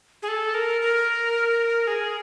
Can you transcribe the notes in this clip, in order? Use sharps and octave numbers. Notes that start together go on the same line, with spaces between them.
G#4
A4
A#4
A#4
G#4